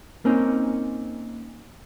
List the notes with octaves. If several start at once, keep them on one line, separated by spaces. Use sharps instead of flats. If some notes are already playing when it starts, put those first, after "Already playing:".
A#3 C4 C#4 D#4